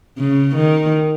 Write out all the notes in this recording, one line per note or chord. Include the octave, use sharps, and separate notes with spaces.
C#3
D#3